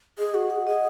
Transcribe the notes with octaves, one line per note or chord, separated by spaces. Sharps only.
G#4 D#5
F#4 F#5
G#4 F#5
G#4 D#5